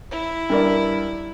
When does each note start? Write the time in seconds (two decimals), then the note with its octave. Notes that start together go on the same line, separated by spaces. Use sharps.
0.11 E4
0.50 G2 A#4 D5